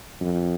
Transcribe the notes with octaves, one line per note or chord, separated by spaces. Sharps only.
F2